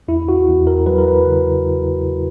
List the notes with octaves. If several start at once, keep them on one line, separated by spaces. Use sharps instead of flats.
E2 E4
F#4
E2
A#4
F#3 B4
A#4
B4
C#3